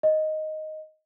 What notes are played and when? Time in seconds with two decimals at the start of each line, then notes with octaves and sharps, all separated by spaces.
0.03 D#5